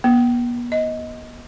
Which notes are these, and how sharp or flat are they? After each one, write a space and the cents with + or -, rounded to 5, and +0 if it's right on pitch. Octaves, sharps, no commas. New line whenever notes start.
B3 -40
D#5 +15